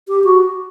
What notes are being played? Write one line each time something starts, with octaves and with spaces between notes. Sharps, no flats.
G4
F#4